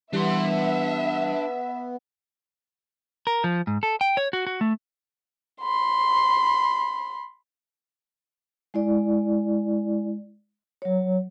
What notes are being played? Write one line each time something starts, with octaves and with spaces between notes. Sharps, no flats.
E3 G3 B3 D4 E5 C6
A#4
F3
G#2
A4
G5
C#5
F#4
F#4
A3
B5 C6
G#3 E4 D5
F#3 C#5